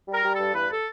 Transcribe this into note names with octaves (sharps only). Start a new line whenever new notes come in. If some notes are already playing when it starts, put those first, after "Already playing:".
G3 A#4
G3
A4
G2
E2 B4
A4